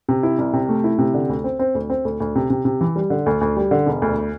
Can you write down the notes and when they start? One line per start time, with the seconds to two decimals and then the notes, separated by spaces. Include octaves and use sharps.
0.09 C3
0.23 E4
0.38 C2
0.53 C3
0.69 A3
0.84 E4
0.98 C3
1.14 D3
1.29 D2
1.44 C4
1.59 C4
1.75 D2
1.90 C4
2.05 D2
2.20 D2
2.35 C3
2.50 C3
2.65 C3
2.81 E3
2.96 G3
3.10 D3
3.26 D2
3.41 D2
3.57 G3
3.71 D3
3.87 E1
4.02 D2